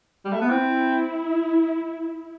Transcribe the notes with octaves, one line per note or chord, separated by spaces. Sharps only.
G3
A3
B3
C4 E4